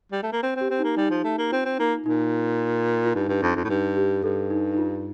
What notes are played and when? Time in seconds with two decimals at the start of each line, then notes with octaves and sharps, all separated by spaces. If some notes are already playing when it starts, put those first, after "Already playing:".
0.12 G3
0.23 A3
0.32 A#3
0.43 C4
0.56 C4
0.61 G4
0.70 C4
0.79 D#4
0.84 A#3
0.97 G3 D#4
1.10 F3
1.24 A3
1.38 A#3
1.51 C4 F4
1.65 C4
1.78 A#3 D#4
2.06 A#2 D#4
3.06 F4
3.15 G2 D#4
3.28 G2
3.42 F2 D4
3.56 F2
3.64 A2
3.69 G2 D#4
3.96 G4
4.24 G2 A4
4.51 D#4
4.73 D#4
4.78 F4